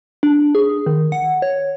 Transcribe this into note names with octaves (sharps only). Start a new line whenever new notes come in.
D4
G#4
D#3
F#5
C#5